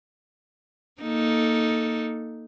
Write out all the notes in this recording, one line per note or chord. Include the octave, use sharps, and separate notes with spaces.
A#3 D#4 A4